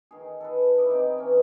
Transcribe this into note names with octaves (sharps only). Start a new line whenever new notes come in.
D#3 G#4
A4 B4
E4 D5 D#5
C4 D#4 D5
E3 C#4